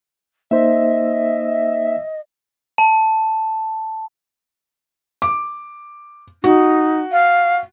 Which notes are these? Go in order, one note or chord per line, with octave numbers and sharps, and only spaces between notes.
A#3 D#4 C5 D#5 E5
A5
D6
D#4 F#4
F5